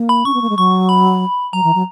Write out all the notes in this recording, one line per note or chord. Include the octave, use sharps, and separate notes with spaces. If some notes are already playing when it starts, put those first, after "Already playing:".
Already playing: A#3
B5
C#4 C#6
B3
A#3
G#3
F#3 C#6
B5
F#3 A#5
E3
F#3